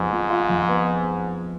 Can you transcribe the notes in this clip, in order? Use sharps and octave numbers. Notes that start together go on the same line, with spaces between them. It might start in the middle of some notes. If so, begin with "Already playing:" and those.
Already playing: F2 G#2 B3
F3
F4
F2
B3